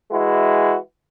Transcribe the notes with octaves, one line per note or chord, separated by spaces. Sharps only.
E3 G#3 E4 F#4